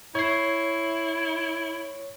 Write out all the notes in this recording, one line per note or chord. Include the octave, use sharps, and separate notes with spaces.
E4 C#5 C7